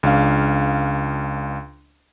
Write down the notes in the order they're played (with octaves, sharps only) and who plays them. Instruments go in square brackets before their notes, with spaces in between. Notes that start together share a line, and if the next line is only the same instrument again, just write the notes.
[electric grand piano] C#2 D4 F5